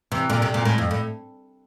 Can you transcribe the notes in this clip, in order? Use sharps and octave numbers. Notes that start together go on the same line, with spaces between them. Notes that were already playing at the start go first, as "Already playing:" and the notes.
C3 E3
A#2 D3
C3
A#2
A2
F2
A2